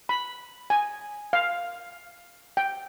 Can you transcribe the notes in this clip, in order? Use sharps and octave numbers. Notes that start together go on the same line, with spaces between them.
B5
G#5
F5
G5